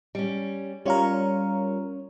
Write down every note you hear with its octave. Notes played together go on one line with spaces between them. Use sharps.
G3 C#4
G3 C#4 F4 A#4 C#5